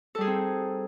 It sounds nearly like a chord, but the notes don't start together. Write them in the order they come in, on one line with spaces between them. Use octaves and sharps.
A4 G3 G#4 D#4 C4